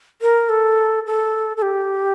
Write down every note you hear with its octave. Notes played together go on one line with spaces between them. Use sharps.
A#4
A4
A4
A4
G4